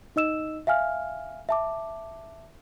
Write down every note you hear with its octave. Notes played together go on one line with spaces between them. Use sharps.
D#4 D#5 E6 E7
E5 F5 G#5 F6
E5 A5 D6